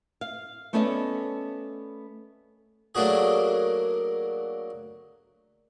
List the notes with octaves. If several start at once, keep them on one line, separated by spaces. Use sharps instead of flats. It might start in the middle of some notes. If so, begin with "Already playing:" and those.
F5
A3 B3 C#4 A4 D5 D#5
F#3 A3 A#3 D4 F#4 G#4